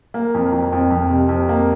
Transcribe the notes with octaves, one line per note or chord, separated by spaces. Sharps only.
A#3
F2
F2
F2
F2
C3
F2
A#3